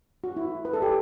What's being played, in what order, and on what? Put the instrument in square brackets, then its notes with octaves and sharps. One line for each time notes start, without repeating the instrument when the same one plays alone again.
[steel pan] F#4
E4
B4
A4
G4